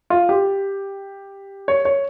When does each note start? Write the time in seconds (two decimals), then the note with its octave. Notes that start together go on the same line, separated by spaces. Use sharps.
0.10 F4
0.29 G4
1.68 C#5
1.85 C#5